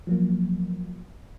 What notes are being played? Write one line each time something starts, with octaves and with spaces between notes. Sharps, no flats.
F3 F#3 A#3